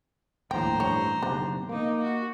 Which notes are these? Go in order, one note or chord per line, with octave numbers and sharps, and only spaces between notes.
D#1 A#1 A2 C5 G5 A#5
A1 G2 C#5
F#1 B1 C3 D4
A#3 D#4 D6
F#4